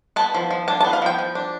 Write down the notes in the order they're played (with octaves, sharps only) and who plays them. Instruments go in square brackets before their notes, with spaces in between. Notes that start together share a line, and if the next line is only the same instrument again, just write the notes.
[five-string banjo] B3 A5
F3
F3
D4 A5
A5
B3
F5
F3 G5
F3
D4